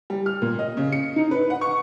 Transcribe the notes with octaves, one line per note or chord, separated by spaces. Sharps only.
G3
F6
A#2
D#5
C#3
C#7
D#4
B4
F#5
C#6